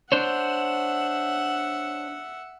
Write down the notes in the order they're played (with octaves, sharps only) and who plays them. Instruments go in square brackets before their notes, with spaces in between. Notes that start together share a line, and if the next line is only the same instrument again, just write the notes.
[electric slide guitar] D4 C5 C#5 [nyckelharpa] E5 F#5